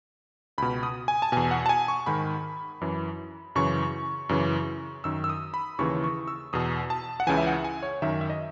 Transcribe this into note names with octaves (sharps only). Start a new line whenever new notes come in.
C#2 B2 B5
D#6
G#5
A5
E2 B2 G#5
F#5
A5
G#5
C#6
G#2 D#3 B5
F#2 E3
F#2 C#3 E3 C#6
F#2 C#3 E3
F#2 D#3 E6
E6
D#6
B5
D#2 C#3 E3 C#6
C#6
E6
E2 B2 D#6
A5
F#5
C#2 C#3 E3 G#5
E5
F#5
G#5
C#5
F#2 D#3 E5
E5
D#5